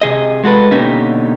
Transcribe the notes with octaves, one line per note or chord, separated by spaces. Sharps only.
C3 G#4 D#5
G#3 F#4 A4 B4
B2 D3 A#3 C#4 D#4 G4